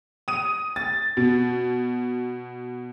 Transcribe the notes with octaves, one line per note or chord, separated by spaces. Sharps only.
D#6 D#7
A6
B2